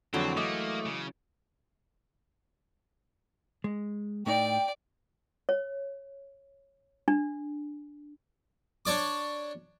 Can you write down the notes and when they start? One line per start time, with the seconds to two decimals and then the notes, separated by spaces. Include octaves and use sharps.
0.14 F2 D3 E3 F#3 G#3 C4
0.37 A3 A#3 D#5 D6 D#6
0.86 C#3
3.64 G#3
4.26 A2 A3 D#4 D5 G5
5.49 C#5
7.08 D4
8.85 D4 C#5 D5 D6